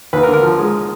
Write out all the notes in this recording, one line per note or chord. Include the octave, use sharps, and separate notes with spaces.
D#2 B4
A#4
D3
A#4
F3
G#3